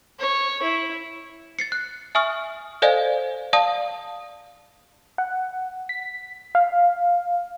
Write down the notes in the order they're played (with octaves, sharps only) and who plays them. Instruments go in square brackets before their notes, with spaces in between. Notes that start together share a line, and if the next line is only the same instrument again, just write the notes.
[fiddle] C#5
E4
[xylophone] A6 C7 C#7
F#6
E5 G#5 C#6 D#6 F6
A4 C5 D5 D#5 F5 G#5
D5 F5 A5 D#6
[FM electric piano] F#5
B6
F5